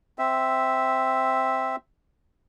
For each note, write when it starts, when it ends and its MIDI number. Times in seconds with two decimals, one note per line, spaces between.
0.19 1.76 60
0.19 1.76 76